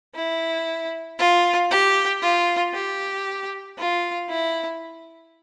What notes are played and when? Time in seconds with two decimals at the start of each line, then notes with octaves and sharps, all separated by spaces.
0.15 E4
1.19 F4
1.71 G4
2.22 F4
2.74 G4
3.78 F4
4.29 E4